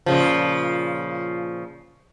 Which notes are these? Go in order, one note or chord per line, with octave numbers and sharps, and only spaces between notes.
A#2 C#3 F3